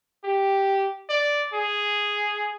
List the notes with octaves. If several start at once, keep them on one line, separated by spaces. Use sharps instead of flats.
G4
D5
G#4